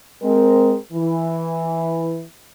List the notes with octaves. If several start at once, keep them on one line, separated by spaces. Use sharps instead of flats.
G#3 C4 A#4
E3